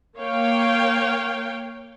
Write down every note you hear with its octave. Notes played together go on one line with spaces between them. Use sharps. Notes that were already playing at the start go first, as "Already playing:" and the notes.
A#3 C#5 F5 G5